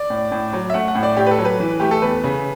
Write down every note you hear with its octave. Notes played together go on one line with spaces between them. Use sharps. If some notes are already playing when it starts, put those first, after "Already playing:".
Already playing: D5
A2
A2
F#3
E5
A3 F#5
F#5
A2
D5
A2 G4
B4
A4
F#3
B4
E3
A3 G4
A4
E2 B4
C#3